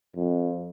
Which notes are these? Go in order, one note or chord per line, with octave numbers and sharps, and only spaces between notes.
F2